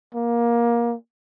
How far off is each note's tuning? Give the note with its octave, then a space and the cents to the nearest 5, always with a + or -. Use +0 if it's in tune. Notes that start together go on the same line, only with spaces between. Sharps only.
A#3 +20